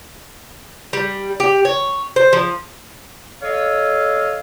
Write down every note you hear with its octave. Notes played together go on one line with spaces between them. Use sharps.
G3
G4
C#5
C5
F3
A4 C#5 D#5 F5